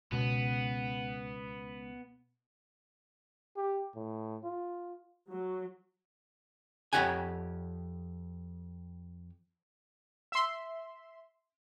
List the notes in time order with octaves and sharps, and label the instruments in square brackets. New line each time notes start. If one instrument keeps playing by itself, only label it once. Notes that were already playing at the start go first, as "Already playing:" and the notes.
[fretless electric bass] C#2 [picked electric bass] B2 [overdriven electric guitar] B3
[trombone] G4
A2
F4
[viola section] F#3
[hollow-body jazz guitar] F2 E3 G4 C#5 F#5 G#5
[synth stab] E5 C6